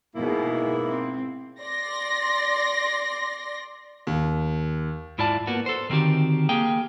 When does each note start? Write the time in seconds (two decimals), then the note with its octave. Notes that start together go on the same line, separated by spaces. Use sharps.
0.16 G#2 B2 A#3 E4 G#4
0.86 C4
1.61 D5 C6 A#6
4.07 D#2
5.18 G#2 E4 F4 D5 A5
5.47 A#3 B3 F#4
5.66 A4 C5
5.90 D3 D#3 C4 F#4 G4
6.49 A#3 G4 G#4 G5